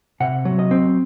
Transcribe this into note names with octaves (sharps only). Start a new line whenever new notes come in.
C3 F#5
F#3
D#5
C4